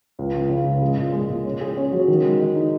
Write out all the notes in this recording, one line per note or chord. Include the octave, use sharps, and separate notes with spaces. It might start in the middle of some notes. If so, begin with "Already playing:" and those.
C#2
C#2
C#3
C#2
G#3
A#2
G#3
A#2
C#4
G#4
C#4
F#3
D#3
G#3
G#3
D#4